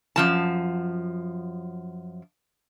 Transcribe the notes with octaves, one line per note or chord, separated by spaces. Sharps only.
F#2 F3 A5